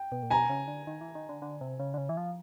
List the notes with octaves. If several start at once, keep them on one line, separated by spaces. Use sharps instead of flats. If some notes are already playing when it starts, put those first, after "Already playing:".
Already playing: G5
B2
A#2
B2 G#5 A#5
C#3
D3
D#3
E3
D#3
D3
D3
C3
C#3
D3
C#3
E3
F3